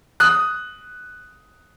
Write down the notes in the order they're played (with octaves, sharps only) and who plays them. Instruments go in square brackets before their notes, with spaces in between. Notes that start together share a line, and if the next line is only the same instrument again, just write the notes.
[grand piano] D#6 F#6